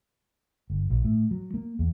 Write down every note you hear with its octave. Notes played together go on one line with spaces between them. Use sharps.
G1
A#1
A2
F#3
A#3
E2